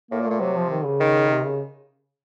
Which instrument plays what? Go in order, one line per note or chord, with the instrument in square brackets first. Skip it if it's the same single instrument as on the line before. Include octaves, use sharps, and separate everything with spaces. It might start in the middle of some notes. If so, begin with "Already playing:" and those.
[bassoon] A2 [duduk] A#3
[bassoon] A#2
[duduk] A3
[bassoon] A#2
[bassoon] C3 [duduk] F#3
[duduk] F3
D#3
C#3
[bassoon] D#3
[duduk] C3
C#3